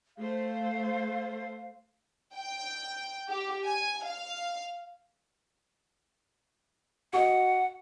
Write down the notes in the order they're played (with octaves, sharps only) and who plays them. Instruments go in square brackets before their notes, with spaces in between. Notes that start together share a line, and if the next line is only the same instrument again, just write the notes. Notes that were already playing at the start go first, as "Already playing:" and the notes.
[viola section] A3 C5 [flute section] F5
[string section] G5
G4
G#5
F5
[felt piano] F#4 D#5 [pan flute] F#5